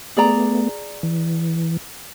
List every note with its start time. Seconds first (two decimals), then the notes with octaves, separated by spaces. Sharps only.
0.17 A3 B3 G#4 D5 A#5
1.03 E3